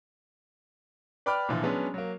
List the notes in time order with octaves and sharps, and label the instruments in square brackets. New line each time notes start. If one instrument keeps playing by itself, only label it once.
[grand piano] B4 D5 G5 B5 D6 F6
A#2 D3 E3 F3
F#3 G#3 B3 C#4 D4
F#3 A#3